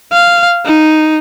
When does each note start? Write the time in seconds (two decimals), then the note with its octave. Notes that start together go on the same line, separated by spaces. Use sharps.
0.13 F5
0.65 D#4